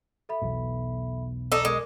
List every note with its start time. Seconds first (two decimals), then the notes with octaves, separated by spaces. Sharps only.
0.29 A4 E5 B5
0.42 B1 E2 B2
1.52 D#4 A4 D6 E6
1.65 G#3 A#4 D6